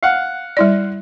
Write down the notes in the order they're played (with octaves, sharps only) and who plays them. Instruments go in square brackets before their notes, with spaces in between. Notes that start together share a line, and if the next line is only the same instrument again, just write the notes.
[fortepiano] F5 F#5
[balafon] G3 E4 D5